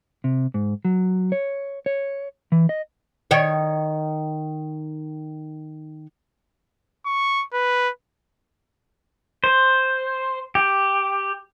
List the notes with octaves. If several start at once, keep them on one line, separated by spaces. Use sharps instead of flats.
C3
G#2
F#3
C#5
C#5
E3
D#5
D#3 C#5
C#6
B4
C5
G4